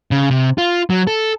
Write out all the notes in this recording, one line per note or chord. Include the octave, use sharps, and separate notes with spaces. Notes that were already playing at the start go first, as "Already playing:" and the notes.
C#3
C3
F4
F#3
A4